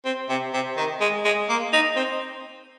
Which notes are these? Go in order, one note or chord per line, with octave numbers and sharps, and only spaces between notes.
C4
C3
C3
D#3
G#3
G#3
A#3
D#4
C4